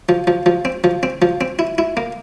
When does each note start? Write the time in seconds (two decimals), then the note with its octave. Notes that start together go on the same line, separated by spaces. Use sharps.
0.09 F3
0.27 F3
0.46 F3
0.65 C4
0.84 F3
1.03 C4
1.22 F3
1.41 C4
1.59 E4
1.78 E4
1.97 A#3